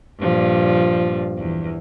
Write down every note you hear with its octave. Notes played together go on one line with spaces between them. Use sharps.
G2 A#2 F3
E2